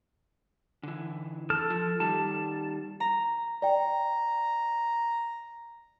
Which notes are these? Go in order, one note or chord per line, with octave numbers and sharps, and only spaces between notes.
D3 E3
A4 F6
F3
D#3 G3 A5
A#5
D5 G5 A#5